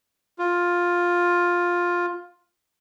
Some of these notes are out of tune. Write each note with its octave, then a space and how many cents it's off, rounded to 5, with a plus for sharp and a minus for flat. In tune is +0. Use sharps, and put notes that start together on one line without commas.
F4 +10